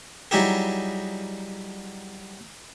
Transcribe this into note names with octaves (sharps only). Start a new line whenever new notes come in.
F#3 G3 D#4 E4 G4 G#4